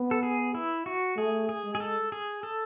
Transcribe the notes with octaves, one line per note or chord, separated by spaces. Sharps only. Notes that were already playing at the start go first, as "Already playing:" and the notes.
Already playing: B3
A4
G#4
E4
F#4
A3 G#4
G#4
G#3
G#4
A4
G#4
A4